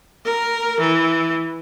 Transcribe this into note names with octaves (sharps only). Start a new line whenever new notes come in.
A#4
E3